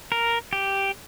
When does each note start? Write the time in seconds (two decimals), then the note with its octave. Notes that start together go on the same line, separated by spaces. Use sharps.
0.12 A#4
0.53 G4